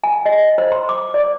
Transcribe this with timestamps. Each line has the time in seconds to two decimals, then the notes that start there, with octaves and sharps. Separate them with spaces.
0.04 G#5
0.26 D#5
0.58 C5
0.72 C6
0.89 D6
1.14 D5